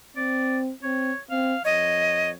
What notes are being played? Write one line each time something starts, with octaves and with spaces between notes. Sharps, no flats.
C4 D5
C4 C#5
C4 F5
F2 C#5 D#5